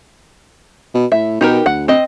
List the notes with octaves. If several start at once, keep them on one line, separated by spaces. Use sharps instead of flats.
B2
A2 E5
B2 D#4 G4 A#4
D2 F#5
C4 D#5